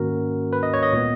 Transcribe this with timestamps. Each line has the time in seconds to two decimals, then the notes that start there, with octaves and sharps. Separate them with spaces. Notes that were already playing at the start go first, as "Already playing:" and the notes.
Already playing: G#2 D#3 A#3 C#4 F#4 A#4
0.53 B4
0.63 D#5
0.74 C#5
0.83 D#5
0.93 A#2 G#3 B3